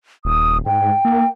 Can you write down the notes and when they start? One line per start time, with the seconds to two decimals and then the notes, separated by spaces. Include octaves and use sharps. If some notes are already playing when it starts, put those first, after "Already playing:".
0.25 D#1 D#6
0.66 G#2 G5
1.05 A#3